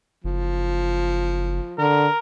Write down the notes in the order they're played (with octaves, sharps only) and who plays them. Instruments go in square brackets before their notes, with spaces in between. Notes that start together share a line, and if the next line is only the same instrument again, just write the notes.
[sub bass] F#1 [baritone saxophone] F3
[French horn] D3 [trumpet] A#4